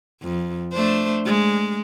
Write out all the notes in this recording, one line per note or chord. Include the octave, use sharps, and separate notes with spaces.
F2
A3 D4 C5
G#3